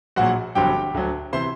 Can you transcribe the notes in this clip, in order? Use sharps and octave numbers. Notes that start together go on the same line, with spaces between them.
A#1 A#2 F#3 F#4 F#5
G1 F2 D3 F#3 G4 G5
D2 D3 F#3
C3 E3 C5 C6